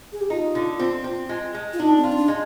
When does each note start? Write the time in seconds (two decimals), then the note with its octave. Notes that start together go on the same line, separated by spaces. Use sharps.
0.13 G#4
0.21 G4
0.30 D#4 F4
0.55 D3
0.79 C4
1.04 C4
1.29 G#3
1.54 G#3
1.73 F4
1.79 D4 D#4
1.97 C4
2.04 F4
2.12 D#4
2.16 D4
2.28 G#3